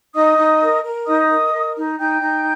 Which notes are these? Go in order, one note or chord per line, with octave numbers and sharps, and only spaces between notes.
D#4 D#5 D#6
D#4
A#4
A#4
D#4 D#5 D#6
A#4
A#4
D#4
D#4 G5 G6
D#4